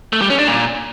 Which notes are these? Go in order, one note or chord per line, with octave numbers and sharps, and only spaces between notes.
A3
G3
C#4
D4
A#2